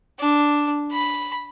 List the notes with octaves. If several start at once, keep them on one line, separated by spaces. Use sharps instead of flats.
D4
B5